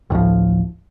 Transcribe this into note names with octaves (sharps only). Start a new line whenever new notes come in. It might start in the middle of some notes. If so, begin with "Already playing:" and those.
A1 D2 A2 F3